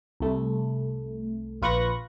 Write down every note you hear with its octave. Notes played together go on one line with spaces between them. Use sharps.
C2 A3
A#1 F4 B4 C#6 F#6 A#6